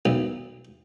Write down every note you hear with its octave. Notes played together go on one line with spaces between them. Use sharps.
B1